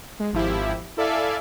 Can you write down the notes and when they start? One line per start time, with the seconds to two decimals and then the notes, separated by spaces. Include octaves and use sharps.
0.20 G#3
0.33 G#1 F3 E4 G4
0.97 E4 A4 D5 E5 F5 G#5